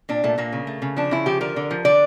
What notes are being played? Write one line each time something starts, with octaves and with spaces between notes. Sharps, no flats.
A#2 D4
A#2 A3
A#2 A#3
C#3
A3
C#3
F3 D4
C#3 E4
F3 G4
D3 A#4
D3
F3
D3 D5